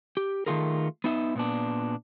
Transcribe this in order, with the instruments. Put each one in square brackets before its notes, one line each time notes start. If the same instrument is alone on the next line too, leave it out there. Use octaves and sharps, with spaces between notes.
[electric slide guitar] G4
D#3 G#3 A3 F4 G#4 A#4
B3 D#4 E5
A#2 B3 D4